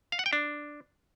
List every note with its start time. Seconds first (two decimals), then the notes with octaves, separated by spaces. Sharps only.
0.12 F5
0.19 F#5
0.26 G5
0.33 D4